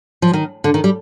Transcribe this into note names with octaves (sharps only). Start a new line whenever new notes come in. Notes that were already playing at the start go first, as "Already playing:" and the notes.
F3
D#3
D3
D#3
G3